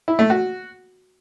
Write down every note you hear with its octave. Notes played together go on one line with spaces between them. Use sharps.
E4
A3
F#4